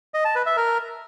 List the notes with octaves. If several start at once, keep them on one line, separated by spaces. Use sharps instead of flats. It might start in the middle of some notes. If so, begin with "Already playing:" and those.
D#5
A5
B4
E5
A#4